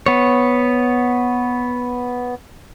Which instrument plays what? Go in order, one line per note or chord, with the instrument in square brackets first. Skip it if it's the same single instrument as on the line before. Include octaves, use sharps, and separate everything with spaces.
[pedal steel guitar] B3 C#5